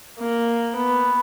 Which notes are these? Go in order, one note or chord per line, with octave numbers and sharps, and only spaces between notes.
A#3
B3